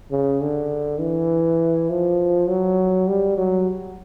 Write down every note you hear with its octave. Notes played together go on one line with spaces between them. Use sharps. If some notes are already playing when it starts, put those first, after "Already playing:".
C#3
D3
E3
F3
F#3
G3
F#3